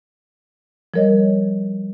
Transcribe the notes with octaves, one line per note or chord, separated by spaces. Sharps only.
F3 G3 A#4 C#5 D#5